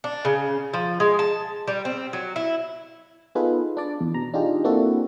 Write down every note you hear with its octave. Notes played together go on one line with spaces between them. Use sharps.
D4
C#3
F3
G#3
A5
G3
C4
F#3
E4
B3 D#4 F4 G#4 A4 B4
D4 D5
E2
B2 A#5
D4 D#4 F4 G4 G#4
A#3 C4 D4 E4 F#4 A4